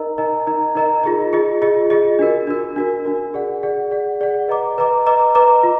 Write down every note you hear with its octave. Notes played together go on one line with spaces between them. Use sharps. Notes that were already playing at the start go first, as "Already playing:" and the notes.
Already playing: D#4 A#4 D#5 A#5
D#4 A#4 D#5 A#5
D#4 A#4 D#5 A#5
D#4 A#4 D#5 A#5
F4 G#4 D#5
F4 G#4 D#5
F4 G#4 D#5
F4 G#4 D#5
D4 F#4 A#4
D4 F#4 A#4
D4 F#4 A#4
D4 F#4 A#4
G#4 D5 F#5
G#4 D5 F#5
G#4 D5 F#5
G#4 D5 F#5
B4 D#5 A#5 D6
B4 D#5 A#5 D6
B4 D#5 A#5 D6
B4 D#5 A#5 D6
F4